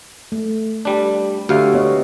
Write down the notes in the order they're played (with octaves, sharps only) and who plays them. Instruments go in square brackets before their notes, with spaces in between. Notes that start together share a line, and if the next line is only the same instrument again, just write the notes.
[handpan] A3
[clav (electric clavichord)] G3 D4
[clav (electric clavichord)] D2 F5 [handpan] F#4 G4 E5
[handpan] B3 C#5 D#5